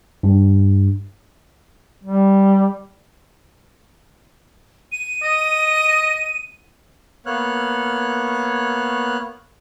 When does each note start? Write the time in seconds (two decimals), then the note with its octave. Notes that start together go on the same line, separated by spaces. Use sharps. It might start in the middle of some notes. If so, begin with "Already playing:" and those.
0.23 G2
2.04 G3
4.92 D#7
5.23 D#5
7.26 A#3 B3 C#5 F6 F#6